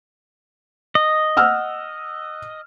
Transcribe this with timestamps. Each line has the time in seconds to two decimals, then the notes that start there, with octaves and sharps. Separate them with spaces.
0.95 D#5
1.37 F#5 E6 F6